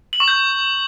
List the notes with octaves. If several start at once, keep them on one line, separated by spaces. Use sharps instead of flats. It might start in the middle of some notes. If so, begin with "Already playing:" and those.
F#7
C#6
G6